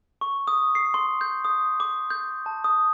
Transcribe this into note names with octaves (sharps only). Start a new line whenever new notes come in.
C#6
D#6
C7
C6
G6
D#6
D6
G6
A5
D#6